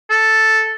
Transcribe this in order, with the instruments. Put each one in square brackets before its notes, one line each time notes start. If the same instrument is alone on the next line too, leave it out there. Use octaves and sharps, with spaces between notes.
[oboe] A4